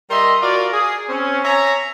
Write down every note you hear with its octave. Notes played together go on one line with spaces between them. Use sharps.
G3 A#4 D#5 E5 C6
F4 F#4 A#4 D5
G#4
C4 C#4
C#5 E5 G#5 A#5